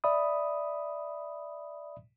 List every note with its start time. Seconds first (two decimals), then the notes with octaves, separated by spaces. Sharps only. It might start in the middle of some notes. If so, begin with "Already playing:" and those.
0.04 D5 E5 B5 D#6